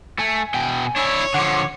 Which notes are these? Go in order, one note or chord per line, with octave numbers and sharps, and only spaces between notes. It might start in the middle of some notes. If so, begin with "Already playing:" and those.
A3 G#5
B2 G5
D4 E4 C#5
D3 F3 F#5 C6 D6